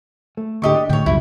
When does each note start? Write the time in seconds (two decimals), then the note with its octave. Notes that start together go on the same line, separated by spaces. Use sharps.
0.37 A3
0.62 D2 A2 D3 G4 D#5 C#6
0.75 D4
0.89 A2 D3 C#5 G5
1.06 C#2 F#2 B2 G3 E4